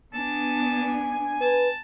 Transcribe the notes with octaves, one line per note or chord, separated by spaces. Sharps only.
B3 D4 G#5 A5
B4 A5